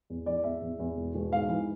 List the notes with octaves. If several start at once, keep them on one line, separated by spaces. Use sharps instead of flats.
E2
E3 D5
E2 E5
E2
E2
E1
E1
G#2 F5
E3